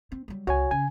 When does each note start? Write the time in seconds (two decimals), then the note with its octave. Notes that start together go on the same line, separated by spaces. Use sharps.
0.12 C4
0.28 F#3 G3
0.47 C2 F#4 C#5 G#5
0.71 C#3 G#5